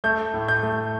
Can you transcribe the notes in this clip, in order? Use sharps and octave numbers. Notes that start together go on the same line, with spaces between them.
A3 G6
A2
G6
A3